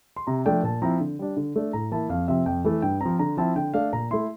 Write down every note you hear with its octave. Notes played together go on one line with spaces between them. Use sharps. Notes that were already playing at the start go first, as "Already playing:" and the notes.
C6
C3 A#5
F3 A3 D4 G5
A#2 A5
F3 C4 E4 A#5
D3
G3 D4
D3
A3 D4
A2 A#5
E3 A#3 E4 A5
F2 F5
C3 F3 C4 E5
F2 G5
E3 A3 E4
G2 G5
F3 C4 A#5
D3 A#5
F3 C4 E4 A5
D3 G5
A3 D4 F5
A#2 A#5
A3 E4 C6